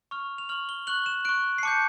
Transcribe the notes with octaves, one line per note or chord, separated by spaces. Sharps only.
C#6 F6 F7
F7
C#6 F6 F#7
G7
C#6 F#6 F#7
E7
C#6 F#6 D7
C7
A5 D6 G6 C#7